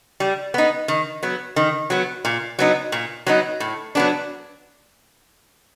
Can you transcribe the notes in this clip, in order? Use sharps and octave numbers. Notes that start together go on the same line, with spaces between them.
G3
B3 D#4
D#3
F#3 B3
D#3
F#3 B3
A#2
F#3 B3 D#4
A#2
F#3 B3 D#4
A2
F#3 B3 D4